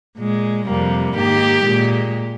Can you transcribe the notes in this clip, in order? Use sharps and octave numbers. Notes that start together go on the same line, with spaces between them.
A#2 G#3
F2 C3 G3 A#3
G#2 D#3 A#3 G4
A#2 G#3